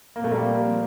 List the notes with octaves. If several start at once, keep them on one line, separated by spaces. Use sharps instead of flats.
A#2 F3 A#3 C4
A3
G3 A#3